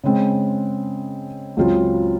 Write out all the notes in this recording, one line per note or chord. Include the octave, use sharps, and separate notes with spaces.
C#3 G#3 C4
C#2 C#3 F#3 C4 F4